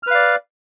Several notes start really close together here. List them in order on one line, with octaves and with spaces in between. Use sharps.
F6 B4 F5 D5